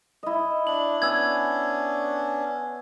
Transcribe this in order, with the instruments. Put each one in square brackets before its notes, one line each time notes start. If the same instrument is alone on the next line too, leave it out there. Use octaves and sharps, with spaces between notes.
[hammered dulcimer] E4 D#5
[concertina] D4 [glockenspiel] F#7
[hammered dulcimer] B3 [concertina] C#4 D4 [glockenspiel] E6 G#6